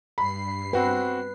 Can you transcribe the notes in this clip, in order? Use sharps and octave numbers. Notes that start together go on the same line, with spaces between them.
G2 B5 C7
C4 F#4 B4 G5